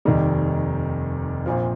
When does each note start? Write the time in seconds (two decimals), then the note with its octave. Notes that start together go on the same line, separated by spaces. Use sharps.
0.05 F1 D#2 D#3 G3
1.46 A#1 A#2 F3 C4 F4